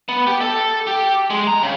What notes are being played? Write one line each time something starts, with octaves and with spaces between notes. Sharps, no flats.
B3
G4
A4
G4
G#3
A#5
C#3